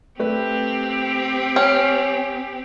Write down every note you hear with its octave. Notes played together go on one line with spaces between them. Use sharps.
A3 C4 G4 B4
C#4